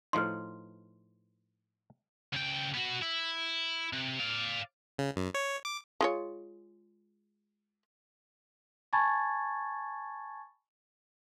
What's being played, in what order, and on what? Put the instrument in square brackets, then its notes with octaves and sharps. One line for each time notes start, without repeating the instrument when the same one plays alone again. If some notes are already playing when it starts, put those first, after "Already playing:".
[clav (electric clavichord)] A2 F3 D#4 [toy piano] B4 C6
[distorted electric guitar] C#2 G5
B3 F#4
E4
C3
D5 F5
[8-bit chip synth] C#3
F#2
C#5
D6
[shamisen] G#3 F4 C#5
[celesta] G#5 A5 B5 C#6 G#6 A6